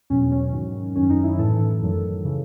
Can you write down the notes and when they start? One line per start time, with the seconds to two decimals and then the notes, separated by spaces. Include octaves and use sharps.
0.10 E2 B2 F#3 C#4
0.32 C#4
0.53 G#2 D#3 F#3
0.95 F#2 D#3 F#3 C#4
1.10 D#4
1.24 E4
1.38 A2 E3 A4
1.82 F#2 D#3 F#3
2.24 C#3 E3